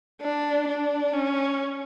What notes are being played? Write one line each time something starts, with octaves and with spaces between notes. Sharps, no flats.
D4
D4
C#4